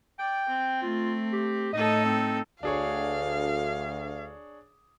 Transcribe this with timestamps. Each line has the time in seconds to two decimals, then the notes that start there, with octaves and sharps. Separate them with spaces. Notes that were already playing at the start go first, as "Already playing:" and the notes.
0.19 D5 G5
0.48 C4
0.82 A3 F4
1.32 G4
1.73 A2 D#4 A4 D#5
2.05 C4
2.63 D2 D4 G#4 C#5 F5